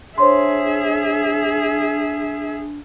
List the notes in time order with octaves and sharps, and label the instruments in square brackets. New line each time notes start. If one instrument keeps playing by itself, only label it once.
[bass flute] D4 [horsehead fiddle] G#4 E5 [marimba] C5 C#5 C6